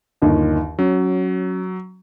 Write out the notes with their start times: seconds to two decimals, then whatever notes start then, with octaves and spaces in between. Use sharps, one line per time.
0.22 G1 D#2 D#3
0.79 F#3 C#4